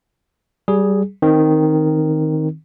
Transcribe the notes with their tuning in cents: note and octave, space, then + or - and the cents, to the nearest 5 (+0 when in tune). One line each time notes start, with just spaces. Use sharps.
G3 -20 G#4 +0
D#3 +0 C4 +0